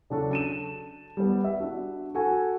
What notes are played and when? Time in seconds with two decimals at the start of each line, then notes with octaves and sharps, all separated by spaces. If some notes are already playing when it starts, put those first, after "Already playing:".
0.10 C#3 F#3 D4 F#4 A4
0.31 A5 D#7 E7
1.17 G3 B3
1.44 E5
1.60 D4 F#4
2.15 F#4 A4 G#5